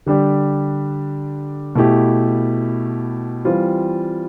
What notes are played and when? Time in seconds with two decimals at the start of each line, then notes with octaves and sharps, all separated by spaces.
0.06 D3 G3 D4 G4
1.75 B2 A3 E4 G4
3.45 E3 G3 C4 F4